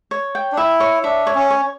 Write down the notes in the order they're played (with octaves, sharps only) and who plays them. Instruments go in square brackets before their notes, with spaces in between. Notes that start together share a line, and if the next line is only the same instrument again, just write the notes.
[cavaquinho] C#5
G5
[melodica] D4
[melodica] E4 [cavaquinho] E5
[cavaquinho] C#5
[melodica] D4 [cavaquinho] E5
[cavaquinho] C#5
[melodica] C#4
[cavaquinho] C#5